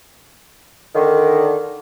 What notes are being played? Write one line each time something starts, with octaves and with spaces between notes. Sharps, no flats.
D3 D#3